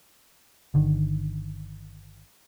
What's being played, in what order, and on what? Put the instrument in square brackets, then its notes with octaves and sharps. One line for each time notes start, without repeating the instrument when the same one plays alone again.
[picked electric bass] G1 D3 D#3